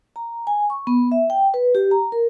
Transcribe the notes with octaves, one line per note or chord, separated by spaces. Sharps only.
A#5
G#5
C#6
B3
E5
G5
B4
G4
A#5
A#4